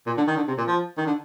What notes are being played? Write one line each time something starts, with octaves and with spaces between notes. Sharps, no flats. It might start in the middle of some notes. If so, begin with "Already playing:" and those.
A#2
D3
D#3
D3
C3
A#2
F3
D#3
D3